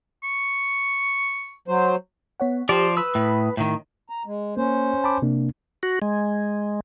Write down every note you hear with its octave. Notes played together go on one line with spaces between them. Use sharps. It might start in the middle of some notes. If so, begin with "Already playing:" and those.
C#6
F#3 C5
B3 C#5 F#5
F3 G4 C5 D5
B4 B5 D#6 E6
A2
A2 D#3
A#5
G#3
A#3 C#4 C5
A5 B5 D6
C3 A#3 D4
F#4
G#3